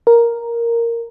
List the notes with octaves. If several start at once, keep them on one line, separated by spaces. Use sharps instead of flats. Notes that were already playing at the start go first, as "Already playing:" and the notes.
A#4